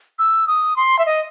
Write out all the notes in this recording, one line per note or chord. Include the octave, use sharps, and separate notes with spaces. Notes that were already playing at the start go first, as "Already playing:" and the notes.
E6
D#6
C6
E5
D#5